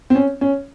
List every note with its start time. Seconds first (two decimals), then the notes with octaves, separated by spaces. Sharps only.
0.10 C4
0.15 C#4
0.41 C#4